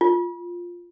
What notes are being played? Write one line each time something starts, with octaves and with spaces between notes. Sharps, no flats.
F4